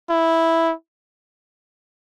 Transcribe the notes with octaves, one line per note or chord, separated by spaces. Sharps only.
E4